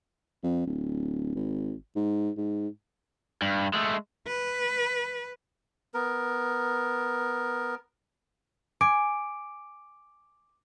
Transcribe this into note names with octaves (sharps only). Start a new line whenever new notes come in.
F2
D1
G#1
G#2
G#2
G2
G#3 A3
B4
B3 A#4
G#5 D6 D7